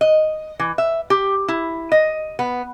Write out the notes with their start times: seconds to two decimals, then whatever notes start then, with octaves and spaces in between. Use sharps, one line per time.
0.01 D#5
0.59 E3
0.78 E5
1.10 G4
1.48 E4
1.92 D#5
2.39 B3